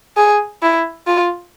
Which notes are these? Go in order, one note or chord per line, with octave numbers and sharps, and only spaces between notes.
G#4
E4
F4